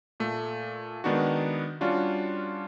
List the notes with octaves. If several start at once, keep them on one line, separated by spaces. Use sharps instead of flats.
A#2 A3
D#3 G#3 B3 D4 D#4 F#4
G3 C#4 D4 F4 F#4